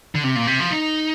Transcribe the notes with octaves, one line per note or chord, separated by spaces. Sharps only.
D3
C3
A#2
C3
F3
D#4